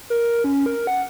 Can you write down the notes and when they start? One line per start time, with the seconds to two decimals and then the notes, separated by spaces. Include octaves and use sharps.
0.10 A#4
0.44 C#4
0.66 A#4
0.87 F#5